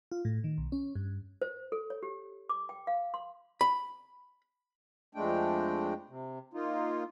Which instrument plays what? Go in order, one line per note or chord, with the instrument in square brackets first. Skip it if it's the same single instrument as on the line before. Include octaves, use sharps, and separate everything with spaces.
[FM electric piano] F4
A2
D#3
B1
C#4
G2
[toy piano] C5
A4
C#5
G4
D6
G5
F5
C6
[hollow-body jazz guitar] B5
[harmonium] F2 G#3 A3 D4 G5
C3
A#3 D#4 F4